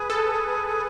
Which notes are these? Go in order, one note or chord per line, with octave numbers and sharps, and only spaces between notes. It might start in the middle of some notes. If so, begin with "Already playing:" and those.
Already playing: G#4 B4
A4